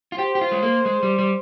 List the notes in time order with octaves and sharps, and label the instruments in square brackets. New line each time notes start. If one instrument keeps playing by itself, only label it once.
[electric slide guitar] F4
[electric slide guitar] G4 [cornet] C5
[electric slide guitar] G4
F4
G#3
A#3
G#3
G3
G3